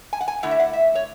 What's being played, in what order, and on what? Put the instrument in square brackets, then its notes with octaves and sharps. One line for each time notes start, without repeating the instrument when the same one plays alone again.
[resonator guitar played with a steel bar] G#5
F#5
G#5
D3 A3 E4 F#5
E5
F#5
E5
C#5